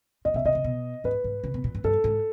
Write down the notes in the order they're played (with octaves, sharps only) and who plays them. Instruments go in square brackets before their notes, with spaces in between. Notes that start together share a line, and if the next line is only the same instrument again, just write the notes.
[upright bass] A#2 [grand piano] D#5
[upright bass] B2 [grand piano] E5
[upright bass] C3 [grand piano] D#5
[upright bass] C3
B2
[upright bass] G#2 [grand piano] B4
[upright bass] G#2
C#3
B2
A#2
G#2
[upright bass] G2 [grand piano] A4
[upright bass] G#2